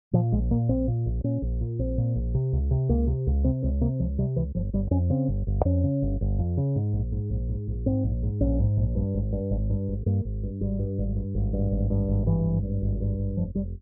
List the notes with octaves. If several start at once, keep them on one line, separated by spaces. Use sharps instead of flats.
A#2 F3
A#1 G#3
A#2 A#3
A#1 C4
A#2
A#1
A#2 C#4
A#1
A#2
A#1 C4
A#2
A#1
C3
C#2
C3
C#2 A#3
C3
C#2
C3 C4
C#2 C4
C3 A#3
C#2 F3
C3 G3
C#2 E3
G1 F3
G1 G3
F2 C#4
C#3 C4
G1
G1
F2 C#4
C#3
G1
G1
F2
C#3
G#2
A#1
G#2
A#1
G#2
A#1
G#2 C4
A#1
G#2
A#1 C#4
G#2
A#1
G2
G#1
G2
G#1
G2
G#1
G2 A#3
G#1
G2
G#1 G3
G2
G#1
G2
G#1
G2
G#1
G2
G#1
G2 E3
G#1
G2
G#1
G2
G#1
F1 F3
F1 G3